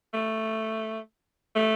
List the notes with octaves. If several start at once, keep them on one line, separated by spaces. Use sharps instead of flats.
A3
A3